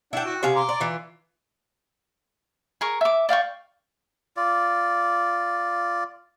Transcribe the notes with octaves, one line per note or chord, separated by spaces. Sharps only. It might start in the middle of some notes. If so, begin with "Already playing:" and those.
D4 E4 F#5 G5
F#4
C3 G#4 F5
A#5 C6 D6
D5
E3 F4
G#4 A#4 C#6
E5 D6
D5 F5 G5 C#6
F4 D5